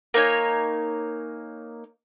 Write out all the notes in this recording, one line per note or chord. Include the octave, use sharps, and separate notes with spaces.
A#3 D#4 C#5 G#5